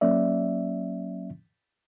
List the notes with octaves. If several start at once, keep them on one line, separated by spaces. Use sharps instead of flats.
F#3 A#3 C#4 D5 E5